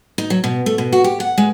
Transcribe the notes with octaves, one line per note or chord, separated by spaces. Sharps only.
D#4
F#3
B2
A3
B2
F#4
G4
F#5
G#3